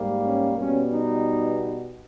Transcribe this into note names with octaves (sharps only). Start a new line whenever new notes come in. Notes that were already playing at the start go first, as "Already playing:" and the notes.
Already playing: G#2 G3 A#3
C#4
B2 G3 B3 C#4
D#4